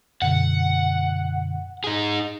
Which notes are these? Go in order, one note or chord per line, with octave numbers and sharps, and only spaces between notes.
F#2 B2 D3 F#5
D#4 G#4